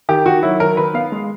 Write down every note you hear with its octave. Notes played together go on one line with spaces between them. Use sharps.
D#3 G4
D#3 F#4
F#3 E4
D#3 A#4
D#3 B4
B3 F5
G#3